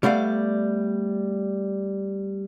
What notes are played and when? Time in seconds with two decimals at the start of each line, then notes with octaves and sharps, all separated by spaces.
0.03 G3 A3 B3 D5 F5